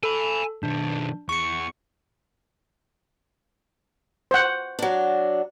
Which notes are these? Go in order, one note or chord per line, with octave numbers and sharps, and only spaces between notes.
A4 G#5 B5
B2 D#3 D4
E2 C#6 C#7
C5 F#5
F#3 D4